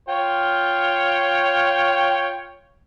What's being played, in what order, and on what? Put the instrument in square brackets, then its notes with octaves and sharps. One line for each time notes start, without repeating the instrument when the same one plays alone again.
[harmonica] F4 C#5 G5